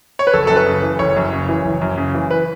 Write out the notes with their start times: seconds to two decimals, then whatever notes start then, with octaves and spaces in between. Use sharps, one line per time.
0.19 C#5
0.27 B4
0.33 F#1 A4
0.47 F#2 A4
0.56 B4
0.66 C#3
0.83 E3
0.99 F#1 C#5
1.16 F#2
1.33 C#3
1.49 E3
1.65 F#1
1.81 F#2
1.98 C#3
2.15 E3
2.31 B4